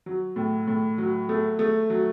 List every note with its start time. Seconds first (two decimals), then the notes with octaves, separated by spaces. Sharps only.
0.06 F#3
0.36 A2
0.67 A2
0.98 F#3
1.29 A3
1.59 A3
1.90 F#3